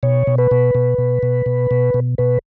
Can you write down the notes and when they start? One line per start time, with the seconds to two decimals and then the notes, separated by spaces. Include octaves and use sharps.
0.03 B2 C#5
0.27 B2
0.38 B4
0.51 B2
0.75 B2
0.98 B2
1.23 B2
1.46 B2
1.71 B2
1.94 B2
2.18 B2 B4